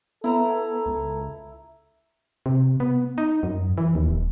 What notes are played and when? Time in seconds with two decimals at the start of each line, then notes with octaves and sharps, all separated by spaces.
0.24 B3 E4 A4 A#5
0.86 C#2
2.46 C3
2.80 B3
3.18 D#4
3.43 F#2
3.78 E3
3.95 D#2
4.08 D#1